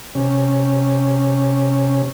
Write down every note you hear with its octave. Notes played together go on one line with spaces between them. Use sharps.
C3 C#4